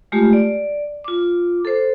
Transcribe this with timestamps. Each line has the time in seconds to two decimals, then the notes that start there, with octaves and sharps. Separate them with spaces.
0.12 G#3 A3 F4 G4
0.33 D5
1.04 F4 D6
1.65 A4 C5